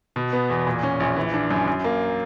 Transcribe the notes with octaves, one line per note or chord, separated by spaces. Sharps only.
B2
B3
E2
A#2
C#4
A#1
E3
D4
F#2
F#2
A#3